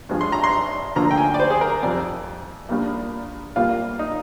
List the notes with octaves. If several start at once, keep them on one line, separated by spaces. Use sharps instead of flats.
G2 F3 G#3
C6
A#5
C6
D2 D3 F3 A#3 A#5
G5
G#5
D5
C5
G#4
A#4
F2 C3 F3 D5
A#1 A#2 G3 A#3
C2 A#2 G3 A#3 F4
D#4